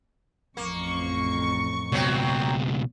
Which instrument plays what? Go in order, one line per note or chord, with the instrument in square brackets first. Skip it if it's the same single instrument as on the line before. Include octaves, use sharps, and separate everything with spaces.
[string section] A1 F2 C#6 [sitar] A#3
[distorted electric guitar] C#2 B2 [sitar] F#3 C4